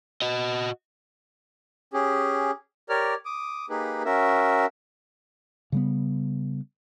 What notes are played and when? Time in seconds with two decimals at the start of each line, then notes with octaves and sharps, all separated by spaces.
0.22 F#4 D#5
1.93 C#4 G4 G#4
2.89 G4 A#4 C#5 D5 F6
3.25 D6 D#6
3.70 A#3 D#4 G4 G#4 B4
4.05 C#4 F#4 A#4 E5
5.72 C#3 G3 B3